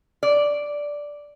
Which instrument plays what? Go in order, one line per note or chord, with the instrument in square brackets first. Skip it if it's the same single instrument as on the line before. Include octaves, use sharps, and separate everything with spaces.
[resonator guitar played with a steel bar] D5